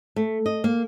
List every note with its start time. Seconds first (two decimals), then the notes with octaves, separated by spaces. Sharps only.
0.16 A3
0.46 D#5
0.64 A#3